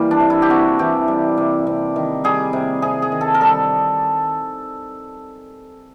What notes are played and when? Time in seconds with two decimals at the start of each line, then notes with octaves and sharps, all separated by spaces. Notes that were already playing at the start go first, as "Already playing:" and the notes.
Already playing: E3 G3 A#3
0.11 D4
0.20 C3
0.30 E4
0.42 G4
0.50 C3 F#4
0.79 E3 G4
1.08 G3
1.38 C3
1.67 C3
1.96 D#3
2.24 G3 G#4
2.53 C3
2.82 C3 G#4
3.02 G#4
3.12 D#3
3.21 A4
3.34 A#4
3.41 G3 A4